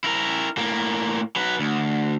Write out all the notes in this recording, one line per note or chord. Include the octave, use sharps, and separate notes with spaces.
E4 A#4
A2 A#3
F#3 B4
D2